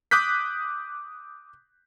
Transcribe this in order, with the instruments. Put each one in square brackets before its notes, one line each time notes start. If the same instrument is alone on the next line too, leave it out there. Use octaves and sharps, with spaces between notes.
[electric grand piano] D6 D#6 F#6 G6 B6